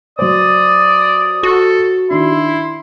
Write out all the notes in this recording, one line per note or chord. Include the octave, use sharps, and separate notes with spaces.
F#3 C5 D5 D#6
F#4 A4
D#3 D4 E4 C6